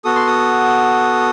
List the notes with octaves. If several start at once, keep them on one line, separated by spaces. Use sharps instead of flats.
B3 F#4 A4 D#6
C6
D#6